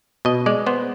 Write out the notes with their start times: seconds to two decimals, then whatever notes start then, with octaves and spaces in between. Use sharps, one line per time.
0.25 B2 D#5
0.46 G#3 D5
0.67 B3 C5